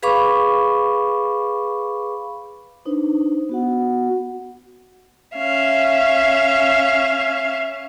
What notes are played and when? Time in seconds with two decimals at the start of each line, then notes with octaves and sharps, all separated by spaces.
0.03 G#4 B4 F5 B5 C#6 D6
2.85 D4 D#4 B4 C5
3.49 B3 F#4 F#5
5.36 C#4 E5 F5